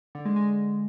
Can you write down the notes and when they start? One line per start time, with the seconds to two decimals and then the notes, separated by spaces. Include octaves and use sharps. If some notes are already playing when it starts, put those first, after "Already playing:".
0.15 D3
0.25 G#3
0.36 G#3